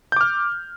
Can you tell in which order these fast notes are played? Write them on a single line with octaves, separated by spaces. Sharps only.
G6 D6 F6